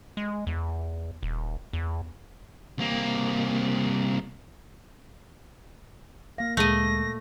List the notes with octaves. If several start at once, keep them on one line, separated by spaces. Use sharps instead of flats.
G#3
E2
D#1
E2
C2 A#3
A#3 F5 A#6
D2 A#2 G#3 A3 D#5 A#6